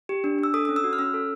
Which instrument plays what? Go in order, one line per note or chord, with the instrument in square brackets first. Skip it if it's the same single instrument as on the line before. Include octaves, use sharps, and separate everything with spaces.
[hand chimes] G4
D4
D4 E6
A4 D#6
C#4 D#6
E6
F#4
F6
C#4 E6
A4